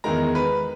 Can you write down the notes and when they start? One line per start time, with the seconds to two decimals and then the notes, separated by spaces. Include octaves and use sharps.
0.04 E2 D#3 G#3 A#4 A#5
0.35 B4 B5